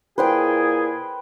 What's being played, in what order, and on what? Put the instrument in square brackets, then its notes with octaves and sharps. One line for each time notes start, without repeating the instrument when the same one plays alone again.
[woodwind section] A#2 E4 G#4 [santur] B4 C5 G5